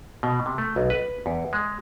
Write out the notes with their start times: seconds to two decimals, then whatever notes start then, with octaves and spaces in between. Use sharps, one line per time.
0.23 B2
0.46 C3
0.58 A3
0.76 B1
0.90 B4
1.26 E2
1.53 G#3